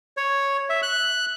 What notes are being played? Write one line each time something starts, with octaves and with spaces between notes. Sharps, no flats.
C#5
E5
F#6